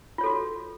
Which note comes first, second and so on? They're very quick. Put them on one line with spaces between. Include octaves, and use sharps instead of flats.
F4 C#5 A4 F#4